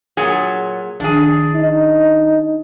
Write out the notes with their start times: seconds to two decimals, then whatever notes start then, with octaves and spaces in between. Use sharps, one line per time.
0.17 A#2 F#3 G#4
1.00 A#1 D#3 D4 G#4
1.54 D#4